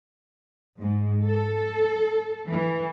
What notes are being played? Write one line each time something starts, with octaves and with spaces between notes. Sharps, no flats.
G#2
A4
E3